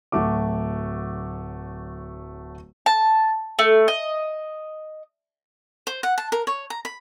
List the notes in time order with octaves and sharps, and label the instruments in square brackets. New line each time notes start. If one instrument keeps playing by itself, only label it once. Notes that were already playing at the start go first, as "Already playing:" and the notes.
[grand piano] D1 F#3 A3 F#4 D6
[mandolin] A5
A3
D#5
[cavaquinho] C5
F#5
A5
A#4
C#5
A#5
B5